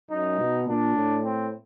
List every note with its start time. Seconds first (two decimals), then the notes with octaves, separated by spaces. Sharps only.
0.11 F#2 D#4
0.39 B2
0.67 A#2 D4
0.95 A2
1.24 C4